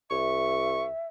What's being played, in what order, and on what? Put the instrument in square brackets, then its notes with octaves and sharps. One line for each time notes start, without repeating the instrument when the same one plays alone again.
[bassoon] C2 [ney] E5 [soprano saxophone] C#6